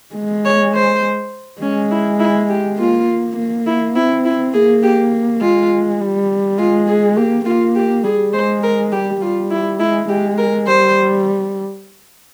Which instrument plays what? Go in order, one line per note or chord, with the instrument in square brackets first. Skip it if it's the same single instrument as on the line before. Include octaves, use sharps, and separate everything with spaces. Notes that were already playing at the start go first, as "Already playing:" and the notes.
[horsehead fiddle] G#3
[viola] C#5
C5
[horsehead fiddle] G#3 [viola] C#4
[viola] E4
E4
G4
[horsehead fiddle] A#3 [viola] F4
[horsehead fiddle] A#3
[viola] E4
[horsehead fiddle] C4 [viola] E4
[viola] E4
[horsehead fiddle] A#3 [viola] G#4
[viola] G4
[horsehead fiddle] G#3 [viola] F4
[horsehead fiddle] G3
[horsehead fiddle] G#3 [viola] F4
[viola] G#4
[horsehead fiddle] A#3 [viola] G4
[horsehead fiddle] A#3 [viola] F4
[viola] G4
[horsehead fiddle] G3 [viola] G#4
[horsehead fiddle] G#3 [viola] C5
[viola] A#4
[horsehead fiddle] G3 [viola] G4
[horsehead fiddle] G3 [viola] F4
[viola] E4
[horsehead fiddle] G#3 [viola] E4
[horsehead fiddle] G#3 [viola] G4
[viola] A#4
[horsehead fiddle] G3 [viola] C5